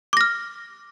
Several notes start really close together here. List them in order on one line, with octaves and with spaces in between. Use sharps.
D6 A#6 F6